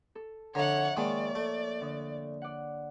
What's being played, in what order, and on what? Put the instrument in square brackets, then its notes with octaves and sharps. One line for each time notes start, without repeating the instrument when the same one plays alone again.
[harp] A4
[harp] F2 E5 A#5 [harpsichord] D3 [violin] C#5 F#5
[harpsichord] D#3 G#3 [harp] A#3 C#5 [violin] D5
[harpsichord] A3
[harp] D3 D#6
D5 F#5